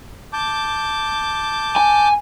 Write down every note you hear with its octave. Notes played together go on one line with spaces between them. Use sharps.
A5 D6 G6
G#5